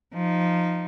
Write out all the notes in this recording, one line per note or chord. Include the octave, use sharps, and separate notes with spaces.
F3 D#4